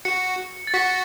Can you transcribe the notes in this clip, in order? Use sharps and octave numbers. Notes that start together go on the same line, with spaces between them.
F#4 C#7
A6
F#4 B6